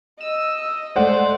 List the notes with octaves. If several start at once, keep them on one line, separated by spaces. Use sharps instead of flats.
D#5 E6
G#3 A3 C5 D5 F#5